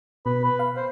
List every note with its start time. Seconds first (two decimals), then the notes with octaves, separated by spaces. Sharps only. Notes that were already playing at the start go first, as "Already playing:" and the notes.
0.26 B2 B4
0.45 B4
0.59 F5
0.77 C5